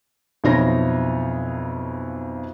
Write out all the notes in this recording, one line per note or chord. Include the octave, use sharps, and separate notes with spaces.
B1 F2 E4 F4 C#5 A#6